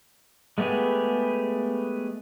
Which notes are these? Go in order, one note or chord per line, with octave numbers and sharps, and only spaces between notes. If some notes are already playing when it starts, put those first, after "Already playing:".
G#3 A3 B3 G4 G#4